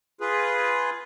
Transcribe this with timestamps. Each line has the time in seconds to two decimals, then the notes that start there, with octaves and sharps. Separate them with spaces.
0.21 F4 G#4 B4